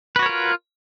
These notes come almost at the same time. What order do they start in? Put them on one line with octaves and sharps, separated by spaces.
B4 F#4 C#5 A#4 F4